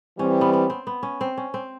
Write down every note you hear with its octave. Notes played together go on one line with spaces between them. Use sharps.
E3 G3 C4 C#4
B3
B3
C4
B3
C#4
C4
C#4
C4